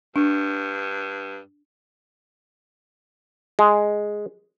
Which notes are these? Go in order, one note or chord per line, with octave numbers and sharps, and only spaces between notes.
G2 D4
G#3